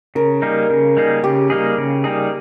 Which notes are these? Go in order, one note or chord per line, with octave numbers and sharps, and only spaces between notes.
C#3 A#4
G3 A#3 D#4 G#4
C#3
G3 A#3 D#4 G#4
C#3 G4
G3 A#3 D#4 G#4
C#3
G3 A#3 D#4 G#4